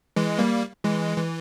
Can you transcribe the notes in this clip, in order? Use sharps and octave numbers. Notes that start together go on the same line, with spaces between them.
E3 G#3
G3 A#3
E3 G#3
E3